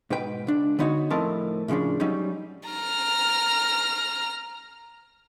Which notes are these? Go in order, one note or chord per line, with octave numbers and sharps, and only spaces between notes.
G#2 B2 B4 G5
C#2 D4
D3 B3 D#4 F#4 C#5
A2 F3 C4 A#4 D#5 A5
A2 C#3 F3 C#4 D4
F#3 G3 C#4 D#4
A#5 F6